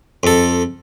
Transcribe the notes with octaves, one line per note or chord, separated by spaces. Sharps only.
F2 A4